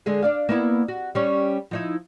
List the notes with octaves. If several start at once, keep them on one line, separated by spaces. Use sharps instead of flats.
D3 G#3 G#4
D4 D5 F5
A#3 B3 E4
F#4
G3 C#4
F3 D#4 E4